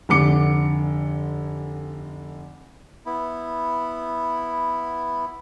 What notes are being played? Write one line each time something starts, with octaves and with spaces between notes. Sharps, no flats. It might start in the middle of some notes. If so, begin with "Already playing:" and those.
F1 D3 D6 C#7
B3 E4